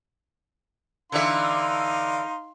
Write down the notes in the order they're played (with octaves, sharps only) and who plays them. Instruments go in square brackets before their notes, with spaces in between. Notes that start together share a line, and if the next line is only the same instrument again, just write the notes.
[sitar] D3 E3 E5 [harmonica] D#4 F5 C6